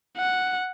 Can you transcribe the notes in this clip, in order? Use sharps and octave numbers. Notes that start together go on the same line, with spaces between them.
F#5